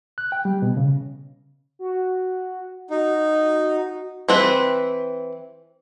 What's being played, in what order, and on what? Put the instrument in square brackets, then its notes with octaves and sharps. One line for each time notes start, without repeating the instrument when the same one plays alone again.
[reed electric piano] F#6
G5
G3
B2
C#3
[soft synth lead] F#4
[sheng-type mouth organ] D#4 [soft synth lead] F#4
[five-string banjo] E3 C4 B4